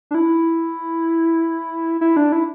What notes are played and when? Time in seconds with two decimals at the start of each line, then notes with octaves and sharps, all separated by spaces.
0.11 D4
0.15 E4
2.01 E4
2.17 D4
2.32 E4